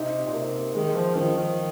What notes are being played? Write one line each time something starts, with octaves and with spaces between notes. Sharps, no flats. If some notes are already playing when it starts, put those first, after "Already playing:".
Already playing: C3 D#4
A#2
C3 A#3
D#3 G#3
F3
D#3 F3
D#3